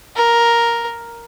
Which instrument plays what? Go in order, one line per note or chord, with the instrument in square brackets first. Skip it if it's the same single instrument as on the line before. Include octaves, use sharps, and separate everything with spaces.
[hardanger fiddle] A#4